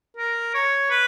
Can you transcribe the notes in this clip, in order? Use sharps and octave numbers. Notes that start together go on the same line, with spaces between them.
A#4
C#5
B4